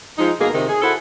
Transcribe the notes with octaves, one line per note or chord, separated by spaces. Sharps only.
F3 G#3 D#4
B2 G#3 A#3 G#4 A#4
C3 D#3
G#4
E4 F#4 A4 C5 F#5